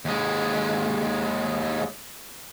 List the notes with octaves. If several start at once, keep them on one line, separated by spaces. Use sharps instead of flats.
D#2 G#3